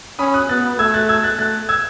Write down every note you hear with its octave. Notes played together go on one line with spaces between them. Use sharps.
C#4 B5 D#6
D#6 F#6
B3 F#6 A6
A3 E6 G#6
F#6 A6
E6 G#6
F#6 A6
A3 F#6 A6
E6 G#6